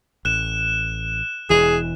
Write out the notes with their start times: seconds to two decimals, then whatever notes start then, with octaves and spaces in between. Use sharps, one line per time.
0.25 A1 F#6 E7
1.50 E1 E3 G#4